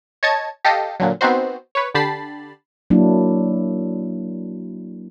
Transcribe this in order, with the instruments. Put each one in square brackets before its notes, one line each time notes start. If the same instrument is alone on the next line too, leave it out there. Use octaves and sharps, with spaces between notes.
[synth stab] C#5 D#5 A5 G#6
G4 A4 D#5 F5
A#2 D3 F#3
B3 C4 D#4 F#4 C5
B4 C#5
D3 G4 A5 B5 A6 C7
[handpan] F#3 A#3 D4 E4